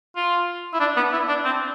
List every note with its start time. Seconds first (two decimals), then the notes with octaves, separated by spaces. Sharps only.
0.16 F4
0.74 E4
0.80 D4
0.96 B3
1.12 E4
1.28 D4
1.44 C4